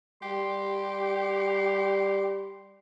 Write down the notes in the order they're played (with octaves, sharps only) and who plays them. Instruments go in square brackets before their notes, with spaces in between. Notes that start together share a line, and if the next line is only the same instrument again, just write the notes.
[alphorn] G3 [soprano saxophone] G4 [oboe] C6